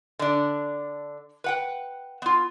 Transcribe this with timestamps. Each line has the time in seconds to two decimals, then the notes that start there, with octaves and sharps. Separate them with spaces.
0.19 D3 D4
1.44 B4 F#5 G5
2.22 B3 F4